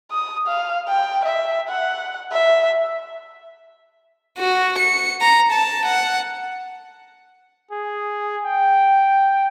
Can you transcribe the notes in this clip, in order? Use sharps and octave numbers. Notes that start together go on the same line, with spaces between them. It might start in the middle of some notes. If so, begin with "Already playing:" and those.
D#6
F5
G5
E5
F#5
E5
F#4
C#7
A#5
A5
F#5
G#4
G5